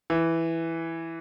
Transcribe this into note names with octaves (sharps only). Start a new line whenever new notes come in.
E3